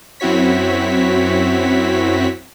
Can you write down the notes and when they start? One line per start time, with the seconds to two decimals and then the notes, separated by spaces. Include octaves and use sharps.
0.20 F#2 C4 E4 F#4 C#5 B6